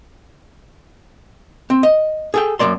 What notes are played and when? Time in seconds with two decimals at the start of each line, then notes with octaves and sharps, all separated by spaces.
1.70 C4
1.83 D#5
2.34 G#4 A4 G5
2.59 F#2 F#3 A#3 D5 C6